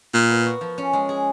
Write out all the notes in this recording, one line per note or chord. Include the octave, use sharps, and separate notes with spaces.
A#2 A#4
B3
F#4
F3
C#4
G#3
G#4